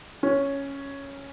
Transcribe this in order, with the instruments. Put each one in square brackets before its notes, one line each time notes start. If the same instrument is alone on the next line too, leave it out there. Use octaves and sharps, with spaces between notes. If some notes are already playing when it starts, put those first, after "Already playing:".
[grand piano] C#4